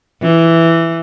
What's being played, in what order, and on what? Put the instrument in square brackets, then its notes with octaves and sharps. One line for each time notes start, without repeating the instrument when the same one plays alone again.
[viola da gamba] E3